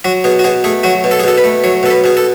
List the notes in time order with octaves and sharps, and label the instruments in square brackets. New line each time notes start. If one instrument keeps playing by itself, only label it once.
[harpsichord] F#3 F#4
B2 G#4
F#4
B2 G#4
A3 G#4
F#3 F#4
B2
A4
G#4
B2 A4
B4
A3
F#3 C#5
B2 A4
B4
B2 G#4
A4